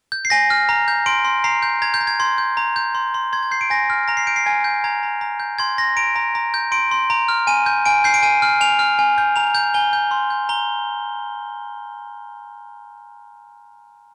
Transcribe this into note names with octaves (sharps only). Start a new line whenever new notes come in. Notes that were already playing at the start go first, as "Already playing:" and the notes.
G6
C7
G#5 A#6
F6
A#5
G6
C6 D7
C6
A#5 C7
G6
A#5 G#6
G6
A#5
G#6
C6 G#6
G6
A#5
G6
C6
C6
C6 G#6
G#6
G6 C7
D7
G#5 A#6
F6
A#5 A#6
C7
G6 D7
C7
G#5 G#6
G6
A#5 G#6
A#5
A#5
G6
C6 G#6
C6 A#6
A#5 D7
A#5
A#5
G6
C6 D7
C6
A#5
F6
G#5 D#7
G6
G#5 D7
G6 C7
D7
G#5 D#7
F6
G#5 F7
F6
G#5
G6
A#5 F7
G6
G#5 G7
G6
C6
G6
A#5 G7